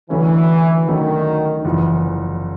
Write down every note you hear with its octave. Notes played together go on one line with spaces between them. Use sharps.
D2 D3 E3 F#3 A3 C#4
D2 D3 D#3 F#3 A3 C#4
F#1 E2 C#3 E3 F3